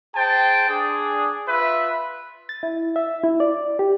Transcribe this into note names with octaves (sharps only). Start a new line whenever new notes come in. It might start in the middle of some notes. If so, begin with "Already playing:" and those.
G#4 C5 G5 A5
D4 G#4
F4 B4 E5
A6
E4
E5
E4
D5
G4